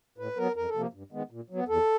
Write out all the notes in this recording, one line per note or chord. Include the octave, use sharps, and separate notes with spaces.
A2 B4
F#3 B3 A#4
F2 A#4
A4
C3 F3 A#3
G2
D#3 G#3 B3
A#2
F#3 B3
E2 A4